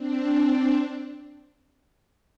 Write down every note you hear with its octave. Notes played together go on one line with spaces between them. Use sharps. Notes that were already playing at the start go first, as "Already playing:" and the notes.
Already playing: C4 D4